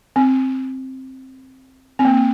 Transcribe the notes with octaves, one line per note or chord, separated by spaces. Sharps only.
C4
C4
A#3